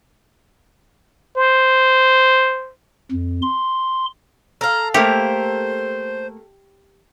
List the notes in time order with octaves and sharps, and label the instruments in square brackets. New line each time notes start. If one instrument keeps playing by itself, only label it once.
[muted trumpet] C5
[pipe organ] F2
C6
[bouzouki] A4 F5 [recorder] A#5
[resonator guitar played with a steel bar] A3 A#3 A#4 [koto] G4 [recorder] C5